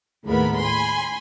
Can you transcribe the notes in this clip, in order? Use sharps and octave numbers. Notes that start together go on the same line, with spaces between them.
D#2 A2 G#3 B3 A#4 B5
G#5 B5 C6